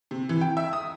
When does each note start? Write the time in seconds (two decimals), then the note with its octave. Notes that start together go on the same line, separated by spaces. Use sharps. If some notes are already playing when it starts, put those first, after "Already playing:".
0.11 C3
0.29 E3
0.41 G5
0.57 E5
0.73 D#6